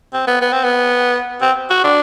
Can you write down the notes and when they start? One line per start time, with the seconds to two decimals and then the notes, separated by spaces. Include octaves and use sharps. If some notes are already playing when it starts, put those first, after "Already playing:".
0.13 C4
0.27 B3
0.41 B3
0.53 C4
0.64 B3
1.41 C4
1.70 F#4
1.84 D4